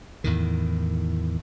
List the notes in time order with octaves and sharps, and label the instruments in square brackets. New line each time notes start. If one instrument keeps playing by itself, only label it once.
[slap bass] E2 A2 D#3